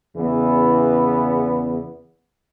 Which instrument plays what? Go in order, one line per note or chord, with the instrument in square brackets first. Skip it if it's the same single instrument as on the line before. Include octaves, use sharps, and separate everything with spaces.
[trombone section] E2 C#3 E3 B3